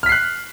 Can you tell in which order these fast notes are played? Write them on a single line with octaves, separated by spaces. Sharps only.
F6 B6 C7 F#6